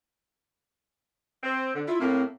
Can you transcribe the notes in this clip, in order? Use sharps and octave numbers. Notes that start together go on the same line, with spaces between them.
C4
D3
E4 F4
A2 A#3 C4